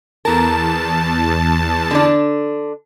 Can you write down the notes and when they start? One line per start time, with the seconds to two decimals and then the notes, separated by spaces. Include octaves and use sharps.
0.25 E2 A#4 A5
1.91 D3 D4